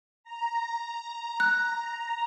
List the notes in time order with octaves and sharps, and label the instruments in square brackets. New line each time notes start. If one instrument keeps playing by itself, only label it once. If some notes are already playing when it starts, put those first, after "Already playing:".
[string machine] A#5
[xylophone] F#6